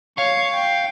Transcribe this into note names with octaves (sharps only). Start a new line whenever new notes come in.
C#5 F5 C#6
G5